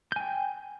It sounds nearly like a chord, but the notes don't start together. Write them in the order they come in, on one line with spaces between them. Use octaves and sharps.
G6 G#5 G5